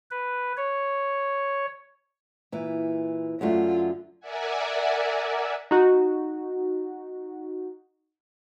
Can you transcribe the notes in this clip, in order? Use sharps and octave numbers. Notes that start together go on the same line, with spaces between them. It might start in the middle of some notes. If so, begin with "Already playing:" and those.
B4
C#5
A#2 E3
F#2 D3 A3 F4
A#4 D5 E5 F#5 G#5
D#4 F#4